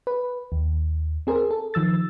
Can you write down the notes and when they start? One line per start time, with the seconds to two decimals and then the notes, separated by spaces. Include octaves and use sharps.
0.07 B4
0.52 D#2
1.27 C4 G#4 A#4 C5
1.51 A4
1.74 D#3 F3 E6 A6